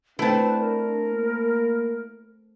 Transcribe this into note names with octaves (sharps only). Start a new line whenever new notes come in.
A3 C4 D4 E4 B4 A5
A#4
A#3